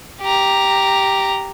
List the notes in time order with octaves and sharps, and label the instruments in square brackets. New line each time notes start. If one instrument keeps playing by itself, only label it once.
[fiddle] G4 A#5